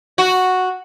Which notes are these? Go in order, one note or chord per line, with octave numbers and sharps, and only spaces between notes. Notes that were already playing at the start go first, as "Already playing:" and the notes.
F#4